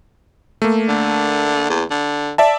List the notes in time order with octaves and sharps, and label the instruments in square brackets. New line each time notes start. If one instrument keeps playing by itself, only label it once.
[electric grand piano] A3 A#3
[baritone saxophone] D3
E2
D3
[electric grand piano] D5 E5 A5